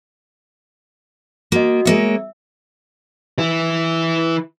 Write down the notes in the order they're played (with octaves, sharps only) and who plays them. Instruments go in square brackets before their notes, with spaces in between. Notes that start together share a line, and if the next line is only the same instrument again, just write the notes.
[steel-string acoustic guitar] A#3 [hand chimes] F#4 D#5
[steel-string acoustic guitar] G#3 A#3 C#5 [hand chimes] E5
[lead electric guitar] E3 E4